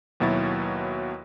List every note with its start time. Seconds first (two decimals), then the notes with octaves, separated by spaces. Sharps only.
0.20 D#2 B2 F#3 E4 A6